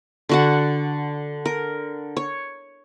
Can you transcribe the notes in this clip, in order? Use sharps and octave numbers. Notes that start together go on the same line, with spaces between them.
D3 F#4 F#5
A#4
C#5